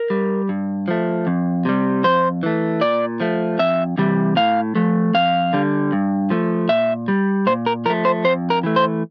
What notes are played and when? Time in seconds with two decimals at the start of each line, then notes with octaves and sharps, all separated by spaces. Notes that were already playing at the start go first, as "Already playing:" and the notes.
Already playing: A#4
0.10 G3
0.49 G2
0.88 F3 A3
1.27 F2
1.65 C3 G3
2.04 F2 C5
2.43 E3 A3
2.81 A#2 D5
3.20 F3 A3
3.59 F2 E5
3.98 C3 E3 G3
4.36 A2 F5
4.75 F3 A3
5.14 F2 F5
5.53 D3 G3
5.92 G2
6.30 F3 A3
6.69 A#2 E5
7.08 G3
7.47 A#2 C5
7.66 A#4
7.85 F3 A#4
7.90 A3
8.05 C5
8.24 F2 C5
8.50 A#4
8.63 E3 A3
8.76 C5